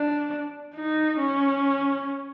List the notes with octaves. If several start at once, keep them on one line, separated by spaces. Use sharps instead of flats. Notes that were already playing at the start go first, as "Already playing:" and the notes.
Already playing: D4
D#4
C#4